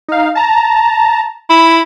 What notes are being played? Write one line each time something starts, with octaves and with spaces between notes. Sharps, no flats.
D#4 F5
A5 A#5
E4 B5